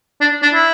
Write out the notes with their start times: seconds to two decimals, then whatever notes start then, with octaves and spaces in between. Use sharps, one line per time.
0.21 D4
0.43 D4
0.53 E4